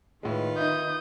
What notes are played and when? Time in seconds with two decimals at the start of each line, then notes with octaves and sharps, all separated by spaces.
0.23 A2 D#3 G#3 F4 B4
0.58 D#4 E5 D#6 G6